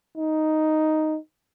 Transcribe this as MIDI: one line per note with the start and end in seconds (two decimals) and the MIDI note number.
0.17 1.17 63